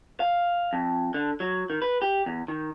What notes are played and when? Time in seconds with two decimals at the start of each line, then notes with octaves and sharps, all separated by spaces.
0.20 F5
0.73 F2
1.14 D3
1.40 F#3
1.70 D#3
1.82 B4
2.02 G4
2.26 E2
2.48 D#3